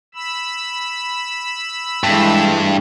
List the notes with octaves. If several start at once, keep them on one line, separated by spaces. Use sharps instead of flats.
B5 E6
G2 E3 G#3 A3